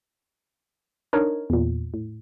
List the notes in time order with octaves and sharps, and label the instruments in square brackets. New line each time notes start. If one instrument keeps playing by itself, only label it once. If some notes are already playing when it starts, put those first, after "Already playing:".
[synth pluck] D4 D#4 A#4 C#5
E2 A#2
A2